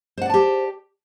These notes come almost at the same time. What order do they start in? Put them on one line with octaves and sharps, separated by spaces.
C5 F#5 D5 A5 G4